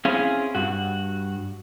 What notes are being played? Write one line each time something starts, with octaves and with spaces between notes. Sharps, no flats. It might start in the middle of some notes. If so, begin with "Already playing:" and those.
C4 C#4 E4 G#4 F5
G2 F#4